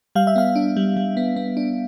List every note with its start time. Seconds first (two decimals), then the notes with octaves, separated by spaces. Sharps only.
0.15 G3 F5
0.27 E5
0.36 B3 F5
0.56 D4
0.77 G3
0.97 G3
1.17 B3
1.36 B3
1.57 D4